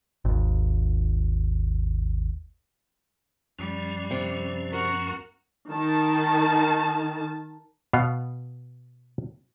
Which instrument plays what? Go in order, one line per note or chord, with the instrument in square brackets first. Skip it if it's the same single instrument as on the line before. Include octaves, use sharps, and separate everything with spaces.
[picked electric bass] G#1 D#2
[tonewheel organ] F#2 F3 C#4 [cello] G3
[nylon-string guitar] C3
[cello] F#4 A#4
[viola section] D#3 A5
[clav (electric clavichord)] B2 B3 F5